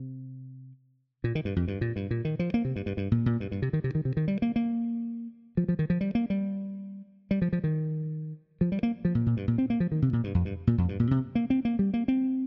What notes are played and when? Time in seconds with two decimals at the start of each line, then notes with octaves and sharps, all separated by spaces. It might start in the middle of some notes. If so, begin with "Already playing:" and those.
Already playing: C3
1.24 A#2
1.35 D#3
1.45 G2
1.56 F2
1.68 G2
1.81 A#2
1.96 G2
2.11 A#2
2.25 D#3
2.39 F3
2.54 A#3
2.65 C3
2.76 G2
2.86 G2
2.97 G2
3.12 A#2
3.26 A#2
3.40 G2
3.51 G2
3.62 C3
3.73 D#3
3.84 C3
3.95 D#3
4.05 C3
4.17 D#3
4.28 G3
4.42 A#3
4.56 A#3
5.57 F3
5.68 F3
5.79 D#3
5.90 F3
6.01 G3
6.15 A#3
6.30 G3
7.31 G3
7.42 F3
7.53 F3
7.64 D#3
8.61 F3
8.72 G3
8.83 A#3
9.05 F3
9.15 A#2
9.26 A#2
9.37 G2
9.48 A#2
9.58 C4
9.70 A#3
9.80 F3
9.92 D#3
10.02 C3
10.13 A#2
10.24 G2
10.34 F2
10.45 G2
10.67 A#2
10.78 F2
10.89 G2
11.00 A#2
11.11 C3
11.35 A#3
11.50 C4
11.65 A#3
11.79 G3
11.94 A#3
12.08 C4